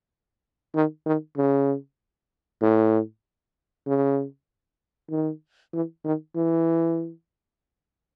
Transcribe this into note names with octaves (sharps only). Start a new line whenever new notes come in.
D#3
D#3
C#3
A2
C#3
D#3
E3
D#3
E3